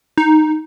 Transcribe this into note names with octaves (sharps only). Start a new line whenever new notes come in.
D#4